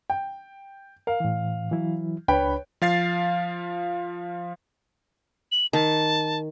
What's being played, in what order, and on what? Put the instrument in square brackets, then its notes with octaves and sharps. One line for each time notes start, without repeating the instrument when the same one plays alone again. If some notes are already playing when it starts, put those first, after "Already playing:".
[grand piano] G5
[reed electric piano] A#4 [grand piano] F5
[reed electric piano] A2 E3
E3 F#3 E4
[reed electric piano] C#2 D4 B5 [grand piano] B4 C#5 G5
[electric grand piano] F3 F5 A6 C7
[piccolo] F#7
[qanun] D#3 [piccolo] A5